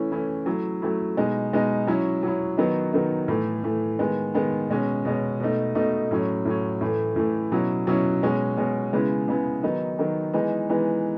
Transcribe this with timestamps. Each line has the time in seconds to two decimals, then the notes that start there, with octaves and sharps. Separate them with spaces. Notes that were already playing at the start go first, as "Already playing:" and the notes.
Already playing: E3 A3 C#4 E4
0.11 E3 A3 C#4 E4
0.46 F#3 A3 E4
0.82 F#3 A3 E4
1.17 B2 G#3 D#4
1.53 B2 G#3 D#4
1.87 F#3 C#4 E4
2.23 F#3 C#4 E4
2.58 D#3 F#3 B3 D#4
2.93 D#3 F#3 B3 D#4
3.28 A2 E3 A3
3.64 A2 E3 A3
3.99 D#3 G#3 B3
4.34 D#3 G#3 B3
4.70 B2 G#3 C#4
5.05 B2 G#3 C#4
5.40 B2 A3 D#4
5.75 B2 A3 D#4
6.11 A2 F#3 C#4
6.45 A2 F#3 C#4
6.81 A2 E3 A3
7.16 A2 E3 A3
7.52 B2 F#3 C#4 E4
7.87 B2 F#3 C#4 E4
8.23 B2 G#3 C#4
8.57 B2 G#3 C#4
8.93 C#3 G#3 B3 E4
9.28 C#3 G#3 B3 E4
9.63 D#3 F#3 B3 D#4
9.99 D#3 F#3 B3 D#4
10.33 E3 G#3 B3 D#4
10.69 E3 G#3 B3 D#4